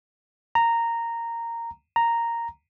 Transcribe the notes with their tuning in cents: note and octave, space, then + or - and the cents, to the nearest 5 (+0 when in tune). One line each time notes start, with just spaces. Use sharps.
A#5 -10
A#5 -5